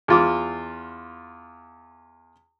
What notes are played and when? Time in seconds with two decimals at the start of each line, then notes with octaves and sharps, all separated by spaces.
0.08 E2 F4 D6